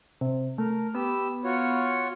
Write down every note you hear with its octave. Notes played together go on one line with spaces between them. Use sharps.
C3
A3 A#4
B3 G4 E6
F4 F#4 C#5